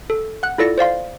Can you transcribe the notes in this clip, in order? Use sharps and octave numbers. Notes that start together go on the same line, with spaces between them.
A4
F#5 F#6
E4 F4 A4 D5 A#6 C#7
C5 D5 F5 C6